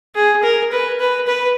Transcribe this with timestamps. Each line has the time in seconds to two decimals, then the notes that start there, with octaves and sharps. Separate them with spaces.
0.15 G#4
0.43 A#4
0.72 B4
1.00 B4
1.27 B4